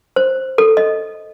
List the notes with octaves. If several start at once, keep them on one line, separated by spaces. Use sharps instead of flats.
C5
A4
D#5